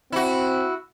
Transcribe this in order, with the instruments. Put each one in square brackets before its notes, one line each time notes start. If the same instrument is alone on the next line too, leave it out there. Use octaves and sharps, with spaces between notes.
[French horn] C4 [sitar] E4 F#4